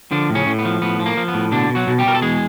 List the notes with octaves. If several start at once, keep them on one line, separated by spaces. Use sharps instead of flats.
D3 F3 D4
A2
C#3 C#4
A2
B3
F3
A2 B3
F3
A#3
F3
B3
A2
B2 D3 D4
B2
F#3 F#4
B2
G3 G4
B2 A#4
A4
E2 G#3 G#4